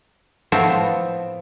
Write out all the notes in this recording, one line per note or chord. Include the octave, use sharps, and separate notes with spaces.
A2 F3 B3 C4 A5